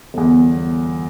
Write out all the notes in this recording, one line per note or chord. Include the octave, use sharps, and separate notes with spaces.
G1 E2